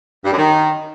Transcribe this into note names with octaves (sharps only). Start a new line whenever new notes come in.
G2
F#2
D#3